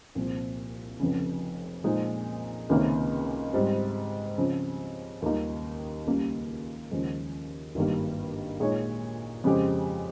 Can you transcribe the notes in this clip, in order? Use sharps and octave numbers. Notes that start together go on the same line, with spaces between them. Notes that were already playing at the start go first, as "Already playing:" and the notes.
C2 A#2 F3 C4
F1 F2 C#3
A#2 F3 G#3 D#4
C#2 C3 D#3 A#3 C#4
G#2 G3 C4
C#3 F3 C4
D#2 D#3 G3 A#3 D#4
C#2 C#3 G3 A#3 C#4
D#2 C#3 F3 G#3
G#1 G2 D#3 G3 A#3
A#2 G#3 D#4 G#4 C#5
F2 C#3 G#3 C4 G4